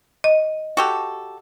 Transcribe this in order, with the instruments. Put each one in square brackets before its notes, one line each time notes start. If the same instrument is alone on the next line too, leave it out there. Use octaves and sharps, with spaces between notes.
[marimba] D#5
[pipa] F#4 G4 A4